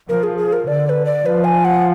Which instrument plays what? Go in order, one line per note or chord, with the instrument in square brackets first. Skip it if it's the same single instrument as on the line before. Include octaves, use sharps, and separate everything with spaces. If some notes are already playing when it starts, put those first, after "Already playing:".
[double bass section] F3 [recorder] A#4
[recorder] G#4
G#4
A#4
[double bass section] D3 [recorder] D5
[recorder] D5
B4
D5
[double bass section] F3 [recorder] B4
[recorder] G#5
F#5